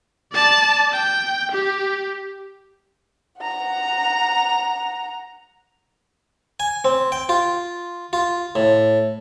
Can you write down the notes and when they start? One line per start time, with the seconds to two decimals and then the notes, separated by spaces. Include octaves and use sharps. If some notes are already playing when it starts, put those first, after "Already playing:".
0.32 D5 A5
0.92 G5
1.52 G4
3.41 F#5 A#5
6.60 G#5
6.85 C4
7.12 G5
7.29 F4
8.13 F4
8.55 A2